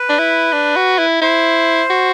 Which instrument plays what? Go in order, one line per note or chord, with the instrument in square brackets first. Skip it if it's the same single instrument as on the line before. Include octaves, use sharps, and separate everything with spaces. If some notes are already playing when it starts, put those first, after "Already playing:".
Already playing: [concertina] B4
[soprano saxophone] D4
E4
D4
F#4
E4
[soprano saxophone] E4 [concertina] C5
[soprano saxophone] F#4